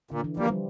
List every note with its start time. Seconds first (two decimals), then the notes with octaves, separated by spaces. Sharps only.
0.11 A#2 D3
0.24 E3
0.37 F3 G3 A#3
0.50 G3